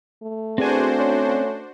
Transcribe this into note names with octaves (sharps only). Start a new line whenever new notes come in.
A3
E2 C4 D4 F#4 C5 G#5
C#4